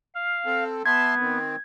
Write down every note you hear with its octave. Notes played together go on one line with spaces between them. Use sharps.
F5
C4 A4
B3 E5 A5 C6 G#6
D#3 C4